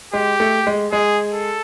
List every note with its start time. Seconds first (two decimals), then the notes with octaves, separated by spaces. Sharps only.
0.13 G#3 G4
0.40 A3
0.67 G#3
0.92 G#3 G#4
1.32 A4